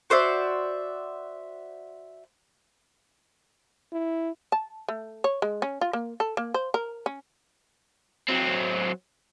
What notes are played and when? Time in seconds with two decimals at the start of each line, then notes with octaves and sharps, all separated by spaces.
0.10 F#4 C5 D5 E5
3.92 E4
4.52 A5
4.89 A3
5.24 C#5
5.42 G#3
5.62 C#4
5.81 F4
5.93 A#3
6.20 A4
6.37 A#3
6.54 C5
6.74 A#4
7.06 C#4
8.28 F#3 C4